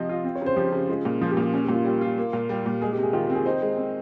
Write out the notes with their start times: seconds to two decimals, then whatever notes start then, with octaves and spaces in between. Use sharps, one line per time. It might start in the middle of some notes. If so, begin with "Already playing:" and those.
Already playing: C3 F3 C4 D#5
0.09 F4
0.24 C4
0.35 C#5
0.41 C#3
0.46 C5
0.56 F3 G4
0.72 C#3
0.88 G#3 F4
1.05 A#2
1.21 F3 F4
1.31 G4
1.37 A#2
1.42 G4
1.54 C#4
1.64 G4
1.69 A#2
1.74 F4
1.85 G3
2.01 F4
2.18 A#3
2.33 A#2
2.49 G3 G4
2.66 A#2
2.82 G#3 G#4
2.92 G4
2.98 C3
3.03 G#4
3.13 D#3 F4
3.24 G4
3.30 C4
3.35 G#4
3.46 D#4 C5
3.62 G#3
3.77 C4